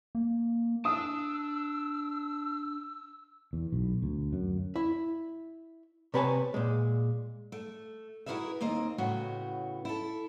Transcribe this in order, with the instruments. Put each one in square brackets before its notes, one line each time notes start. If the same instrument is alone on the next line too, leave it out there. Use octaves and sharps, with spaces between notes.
[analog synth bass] A#3
[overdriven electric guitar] D4 A5 [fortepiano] D#6 [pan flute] E6
[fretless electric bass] E2
B1
D2
F#2
[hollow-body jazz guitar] E4
C3 B3 B4 C#5 G#5 A5
A#2 G#3
[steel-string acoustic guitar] A3
E4 F#4 G#4 A#4 B4 E5
D#2 A#3 C4 D#5
A2 C#3 B3 C#4 F#4
E4 A4